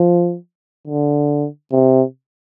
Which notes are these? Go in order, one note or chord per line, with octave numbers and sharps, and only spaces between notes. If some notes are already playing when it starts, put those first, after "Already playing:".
Already playing: F3
D3
C3